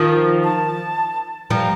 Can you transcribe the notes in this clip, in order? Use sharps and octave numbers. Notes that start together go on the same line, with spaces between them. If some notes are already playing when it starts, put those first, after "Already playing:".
Already playing: D#3 F3
A5
F3 G3 A#5